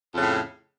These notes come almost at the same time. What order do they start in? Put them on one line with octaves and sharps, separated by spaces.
F2 C#3 A2